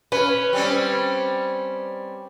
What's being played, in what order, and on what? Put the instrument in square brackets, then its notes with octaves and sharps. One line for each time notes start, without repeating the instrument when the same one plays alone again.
[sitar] C#4 [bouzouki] B4
[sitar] G3 C4 C#4